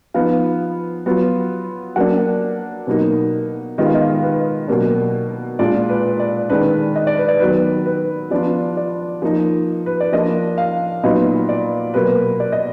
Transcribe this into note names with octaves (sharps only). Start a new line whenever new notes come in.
F3 B3 D#4 F5
F#3 B3 F4
F#3 A#3 D4 F#5
B2 F#3 A#3 D#4
D#3 G#3 B3 F4 D#5
F5
D#5
F5
D#5
B4
B2 F#3 A#3 D4
A#2 G#3 D4 F4 D5
B4
D5
D#3 G#3 D4 B4
D#5
D5
B4
D5
D#3 F#3 B3 B4
B4
F3 B3 D4 F4 D5
D5
F3 A#3 D#4
B4
D5
F3 A#3 D4 F4 D#5
F5
A#2 F#3 B3 D#4 D#5
D5
B2 F#3 A#3 B4
D5
D#5